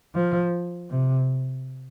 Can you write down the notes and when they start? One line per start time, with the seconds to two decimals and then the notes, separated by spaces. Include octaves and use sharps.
0.15 F3
0.90 C3